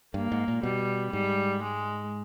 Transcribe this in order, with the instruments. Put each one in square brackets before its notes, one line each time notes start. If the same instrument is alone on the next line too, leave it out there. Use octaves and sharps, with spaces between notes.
[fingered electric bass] G2 [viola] A#3
[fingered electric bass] G#2
A#2
[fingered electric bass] B2 [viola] G3
[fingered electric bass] G#2 [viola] G3
[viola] G#3